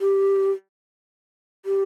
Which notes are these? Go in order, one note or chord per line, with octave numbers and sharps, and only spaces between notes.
G4
G4